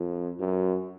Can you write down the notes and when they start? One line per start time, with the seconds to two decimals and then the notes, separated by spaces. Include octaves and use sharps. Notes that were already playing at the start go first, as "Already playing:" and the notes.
Already playing: F2
0.40 F#2